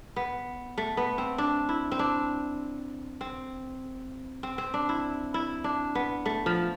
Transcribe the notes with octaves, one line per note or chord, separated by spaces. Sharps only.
B3
A3
B3
C4
D4
E4
C4
D4
C4
C4
C4
D4
E4
E4
D4
B3
A3
F3